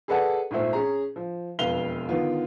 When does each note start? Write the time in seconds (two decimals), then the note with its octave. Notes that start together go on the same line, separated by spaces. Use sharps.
0.08 G#4 A4 B4 D5 F#5 A5
0.51 G#1 A#2 A3 C4
0.73 C#4 G#4 A#5
1.16 F3
1.59 E1 F2 B4 F5 F7 G7
2.09 D3 D#3 B3 F4